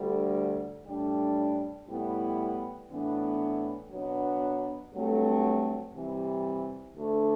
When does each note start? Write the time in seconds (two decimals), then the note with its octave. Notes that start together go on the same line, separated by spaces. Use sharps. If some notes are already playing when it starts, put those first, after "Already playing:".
Already playing: D2 D3 G3
0.87 A2 G3 D4
1.87 A2 G3 B3 E4
2.89 A2 E3 B3 D4
3.91 B2 F#3 B3 D4
4.92 G2 F#3 A3 C4
5.94 C3 E3 G3
6.95 D2 D3 A3 D4